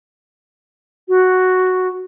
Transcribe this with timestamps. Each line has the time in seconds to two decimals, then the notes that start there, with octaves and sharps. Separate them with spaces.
1.08 F#4